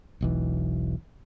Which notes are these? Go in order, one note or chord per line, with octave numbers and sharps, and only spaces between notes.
E1 B1 E3